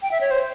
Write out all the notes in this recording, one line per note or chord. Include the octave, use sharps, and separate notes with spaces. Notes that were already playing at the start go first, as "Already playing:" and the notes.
G5
E5
C#5
C5